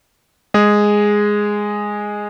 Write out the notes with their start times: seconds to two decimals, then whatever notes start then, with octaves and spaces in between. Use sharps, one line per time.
0.54 G#3 G#4